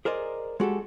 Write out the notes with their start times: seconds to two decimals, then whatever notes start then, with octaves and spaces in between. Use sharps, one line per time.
0.05 G#4 A#4 C5 D5 D#5
0.60 G#3 F#4 G4 A4